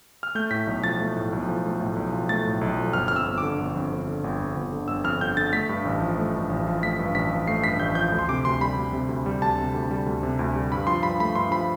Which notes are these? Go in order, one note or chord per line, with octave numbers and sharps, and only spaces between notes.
F6
A3 G6
A2 B6
B1
F3 A6
A3
A2
B1
F3
A3
A2
B1
F3
A3 A6
A2
B1
F3
G1 F6
F2 F6
E6
G1
D3 D6
G1
F2
G1
D3
G1
F2
G1
D3
G1 E6
F2 F6
G1 G6
D3 A6
A3 B6
G2
A1
F3
A3
G2
A1
F3
A3 B6
G2
A1 B6
F3
A3 C7
G2 B6
A1 G6
F3 G6
D2
C6
C3 D6
D2 C6
G3 B5
D2
C3
D2
G3
D2 A5
C3
D2
G3
D2
C3
D2
G3
G2 B5
F3 C6
G2 B5
A3 B5
G2 C6
F3 B5